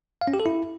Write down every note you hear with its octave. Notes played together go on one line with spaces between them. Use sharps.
F5
C#4
G4
A4
E4